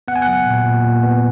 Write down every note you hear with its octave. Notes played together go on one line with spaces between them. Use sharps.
B3 F#5
G#5
F#5
F#3
A#2
A#2
A#2
B3